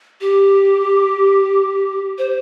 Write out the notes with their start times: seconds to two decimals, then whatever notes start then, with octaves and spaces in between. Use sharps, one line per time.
0.21 G4
2.18 C5